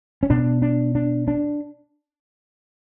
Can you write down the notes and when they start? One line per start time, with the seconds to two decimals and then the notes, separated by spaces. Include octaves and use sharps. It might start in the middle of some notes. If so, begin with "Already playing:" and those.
0.23 C#4
0.30 B2 D4
0.62 D4
0.95 D4
1.28 D4